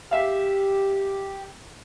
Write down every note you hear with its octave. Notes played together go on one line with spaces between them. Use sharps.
G4 E5 F5